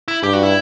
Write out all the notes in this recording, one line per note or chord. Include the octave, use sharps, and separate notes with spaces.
E4
G2 G4
F#4
E4